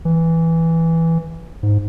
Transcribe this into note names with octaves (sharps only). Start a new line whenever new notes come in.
E3
G#2